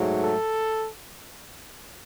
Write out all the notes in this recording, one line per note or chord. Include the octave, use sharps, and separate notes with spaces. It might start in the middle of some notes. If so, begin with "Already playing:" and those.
Already playing: G#2 F#3 A3
A4